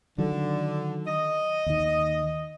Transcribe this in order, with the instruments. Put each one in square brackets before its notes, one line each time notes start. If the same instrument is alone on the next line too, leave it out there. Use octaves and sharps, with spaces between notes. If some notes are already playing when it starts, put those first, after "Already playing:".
[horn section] D3 [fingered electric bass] D#3 F#3
[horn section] D#5
[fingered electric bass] D#2 D#3